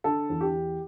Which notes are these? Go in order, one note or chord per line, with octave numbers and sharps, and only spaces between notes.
D3 A4
E2
G4